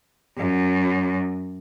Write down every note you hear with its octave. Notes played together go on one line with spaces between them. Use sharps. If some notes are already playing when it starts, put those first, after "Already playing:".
F#2